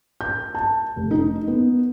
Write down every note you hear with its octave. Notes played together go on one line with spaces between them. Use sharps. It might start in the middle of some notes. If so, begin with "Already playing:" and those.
G6
A5
F1
D#4
B3